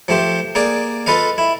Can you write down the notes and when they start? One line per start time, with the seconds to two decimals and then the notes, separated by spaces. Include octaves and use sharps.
0.08 F3 A3 G4 C5
0.55 A#3 G#4 D5
1.07 F4 A4 B4 D#5 F5
1.38 E4